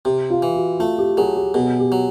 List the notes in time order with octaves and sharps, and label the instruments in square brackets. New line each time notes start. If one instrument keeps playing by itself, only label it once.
[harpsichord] C3 [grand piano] G4
[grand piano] F4
[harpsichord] E3
[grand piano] F#4
[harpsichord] A3 [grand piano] F4
[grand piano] G4
[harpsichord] F#3 [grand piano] G#4
[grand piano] G4
[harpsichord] B2 [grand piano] G#4
[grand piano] G4
[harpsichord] F#3